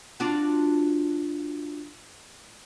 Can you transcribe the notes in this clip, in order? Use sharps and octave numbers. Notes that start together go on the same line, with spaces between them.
D4 F4 F#4